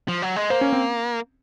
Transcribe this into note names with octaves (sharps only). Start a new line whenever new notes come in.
F3
F#3
G#3
A#3 C5
C#4
C4